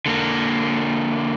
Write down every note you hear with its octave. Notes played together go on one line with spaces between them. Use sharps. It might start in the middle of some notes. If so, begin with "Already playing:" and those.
D3 A#3